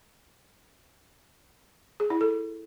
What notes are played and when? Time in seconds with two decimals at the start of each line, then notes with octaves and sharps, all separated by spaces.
2.00 G#4
2.10 E4
2.21 A4